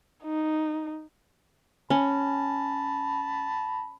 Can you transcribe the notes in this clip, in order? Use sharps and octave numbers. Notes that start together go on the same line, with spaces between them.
D#4
C#4 A5 B5